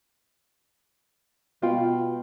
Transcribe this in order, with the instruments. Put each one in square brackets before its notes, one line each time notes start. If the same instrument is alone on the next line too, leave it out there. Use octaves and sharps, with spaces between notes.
[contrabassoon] B2 [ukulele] F4 G5